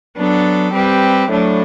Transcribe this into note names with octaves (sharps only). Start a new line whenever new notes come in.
F#3 B3 D4 A4
G3 C4 G4 B4
A2 F#3 A3 D4